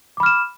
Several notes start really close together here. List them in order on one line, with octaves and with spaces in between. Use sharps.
D6 B5 F6 E7